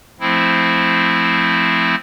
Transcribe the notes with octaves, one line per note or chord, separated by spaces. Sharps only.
F3 A3 C4 E4